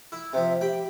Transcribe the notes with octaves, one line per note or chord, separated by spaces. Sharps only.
E4
C3 F3 E5
G4 G5 B5